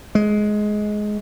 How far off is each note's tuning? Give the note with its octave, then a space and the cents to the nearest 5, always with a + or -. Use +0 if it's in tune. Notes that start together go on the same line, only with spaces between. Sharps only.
G#3 +15